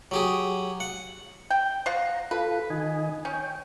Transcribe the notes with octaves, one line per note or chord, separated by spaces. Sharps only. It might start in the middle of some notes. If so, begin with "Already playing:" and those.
F#3 G4 G#4
F#5
G5
F3 F4 F#5 A#5
F4 A4 B4
D#3 D#5 G#5
C#4 C#5 G5